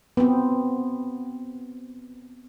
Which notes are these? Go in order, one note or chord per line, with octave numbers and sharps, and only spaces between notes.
B3 C4